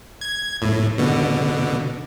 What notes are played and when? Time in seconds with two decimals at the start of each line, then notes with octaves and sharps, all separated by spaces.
0.21 G#6
0.62 A2
0.98 B2 D3